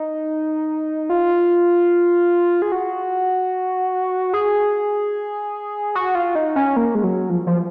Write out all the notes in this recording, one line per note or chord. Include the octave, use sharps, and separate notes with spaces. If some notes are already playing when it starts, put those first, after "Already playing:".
Already playing: D#4
F4
G#4
F#4
G#4
F#4
F4
D#4
C#4
A#3
G#3
F#3
F3
F3